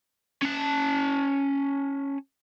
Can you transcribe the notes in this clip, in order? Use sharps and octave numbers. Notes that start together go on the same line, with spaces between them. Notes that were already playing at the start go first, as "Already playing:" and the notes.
C#4 A5